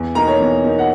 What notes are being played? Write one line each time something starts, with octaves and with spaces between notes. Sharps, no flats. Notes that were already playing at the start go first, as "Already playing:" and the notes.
Already playing: E2
B2 A#3 D#4 A#5
C#5
E2
B2 A#3 D#4
F#5